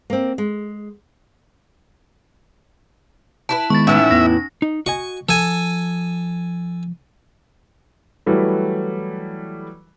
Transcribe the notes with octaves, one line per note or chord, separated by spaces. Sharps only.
A#3 C4
G#3
E4 F#4 B4 A5
D#3 G#3 B3 C#6 A6
A2 E3 C#4 D#4 E4 E5
E2 B3 A#6
D#4
F#4 D#5 G#5 C#6
F3 A4 G#5
E3 F#3 G3 A3 E4 B4